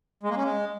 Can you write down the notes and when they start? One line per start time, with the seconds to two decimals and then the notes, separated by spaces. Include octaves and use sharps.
0.23 G#3
0.30 A#3
0.37 C#4
0.44 G#3